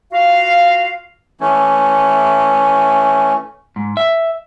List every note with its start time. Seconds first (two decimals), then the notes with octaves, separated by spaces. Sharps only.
0.12 F4 F#4 F5
1.41 E3 A3 C#4
3.76 G#2
3.97 E5